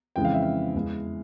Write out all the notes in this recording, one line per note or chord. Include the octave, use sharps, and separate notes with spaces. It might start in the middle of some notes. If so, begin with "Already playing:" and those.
F2 C#3 E3 G#3 G5
F5
E5
F5
E2 E3 G#3